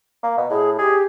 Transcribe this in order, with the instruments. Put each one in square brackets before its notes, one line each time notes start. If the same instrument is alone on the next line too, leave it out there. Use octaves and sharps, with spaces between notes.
[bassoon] A#3
B2
[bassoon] A2 [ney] G#4
[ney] G4 [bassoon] G#4